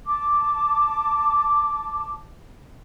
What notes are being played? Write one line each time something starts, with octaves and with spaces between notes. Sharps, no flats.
A5 D6